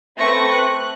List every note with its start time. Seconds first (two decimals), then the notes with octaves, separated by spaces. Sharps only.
0.18 A3 C4 B4 C#6 A#6
0.51 F#6